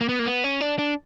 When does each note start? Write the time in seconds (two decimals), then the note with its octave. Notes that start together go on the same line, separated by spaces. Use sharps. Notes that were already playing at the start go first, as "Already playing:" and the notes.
0.01 A#3
0.09 B3
0.19 A#3
0.26 B3
0.44 C#4
0.61 D4
0.79 D4